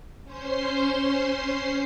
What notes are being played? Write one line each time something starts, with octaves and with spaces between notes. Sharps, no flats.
C#4 C5 C6 C7